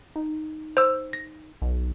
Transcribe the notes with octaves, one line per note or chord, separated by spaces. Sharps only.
D#4
C5 E6
A#6
B1